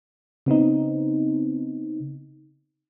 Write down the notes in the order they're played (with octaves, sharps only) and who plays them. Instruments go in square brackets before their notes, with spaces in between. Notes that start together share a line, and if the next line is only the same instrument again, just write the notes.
[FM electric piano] C#3 B3 C4 D#4